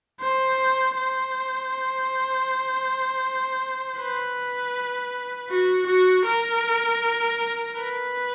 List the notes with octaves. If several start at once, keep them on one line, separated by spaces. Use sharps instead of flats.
C5
C5
B4
F#4
F#4
A#4
B4